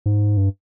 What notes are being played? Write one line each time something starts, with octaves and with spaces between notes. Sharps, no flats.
G#2
G2